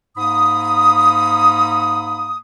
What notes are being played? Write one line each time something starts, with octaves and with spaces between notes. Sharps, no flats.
G#2 A#3 B5 D#6